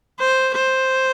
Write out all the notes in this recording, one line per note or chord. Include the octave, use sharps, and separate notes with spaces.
C5
C5